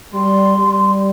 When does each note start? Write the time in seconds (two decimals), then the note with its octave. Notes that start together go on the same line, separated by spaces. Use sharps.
0.13 G3 C6
0.58 G3